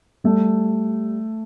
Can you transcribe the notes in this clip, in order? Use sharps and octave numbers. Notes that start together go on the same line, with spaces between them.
G3 A3